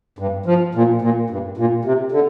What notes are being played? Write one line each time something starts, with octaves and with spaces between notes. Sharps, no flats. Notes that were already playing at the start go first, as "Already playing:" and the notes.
G2
F3
A#2
A#2
G2
A#2
C3
D3